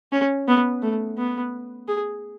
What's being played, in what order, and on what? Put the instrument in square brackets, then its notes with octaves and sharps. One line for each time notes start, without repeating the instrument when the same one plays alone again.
[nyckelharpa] C#4
B3
A3
B3
G#4